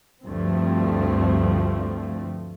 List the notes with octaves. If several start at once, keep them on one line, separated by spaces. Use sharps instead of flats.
D2 G2 F3 A3 C4